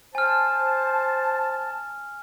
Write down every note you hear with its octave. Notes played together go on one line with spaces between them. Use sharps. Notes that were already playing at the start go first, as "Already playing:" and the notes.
C5 G#5 A5 F6